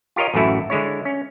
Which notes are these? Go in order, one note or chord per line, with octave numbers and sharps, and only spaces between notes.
F4 G4 A#4 C#5 D#5
A1 F#2 A2 A3 E4 F#4
D3 G#3 E4 C#5
C#4